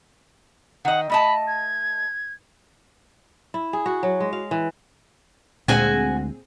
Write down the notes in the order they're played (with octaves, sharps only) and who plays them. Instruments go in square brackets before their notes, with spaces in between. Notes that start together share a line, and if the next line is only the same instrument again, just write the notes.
[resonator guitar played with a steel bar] D#3 D#5 [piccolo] F#5
[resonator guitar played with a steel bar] A3 D#5 A5 [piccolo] B5
[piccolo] G#6
[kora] E4
G#4
F#4
F#3
G#3
F5
E3
[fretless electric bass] D2 G#3 [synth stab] A#2 C4 G#4 [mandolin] F#4 G#5